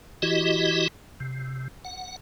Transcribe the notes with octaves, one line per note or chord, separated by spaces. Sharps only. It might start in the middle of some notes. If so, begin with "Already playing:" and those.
E3 E4 F#4 G4 D#5
C3
F#5